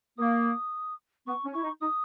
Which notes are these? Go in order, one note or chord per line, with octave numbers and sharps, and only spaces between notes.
A#3 D#6
B3 C#6
C#4
E4 C#6
D#4
D#4 D#6